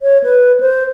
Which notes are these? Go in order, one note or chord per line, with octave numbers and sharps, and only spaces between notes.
C#5
B4
C5